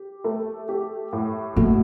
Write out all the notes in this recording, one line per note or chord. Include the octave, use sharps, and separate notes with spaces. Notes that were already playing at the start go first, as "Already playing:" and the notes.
Already playing: G4
A3
G4
A2
B2 A3